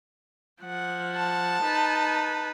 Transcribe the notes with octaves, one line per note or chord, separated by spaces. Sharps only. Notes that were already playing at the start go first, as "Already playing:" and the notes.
F3 F#5
A5
D#4 B4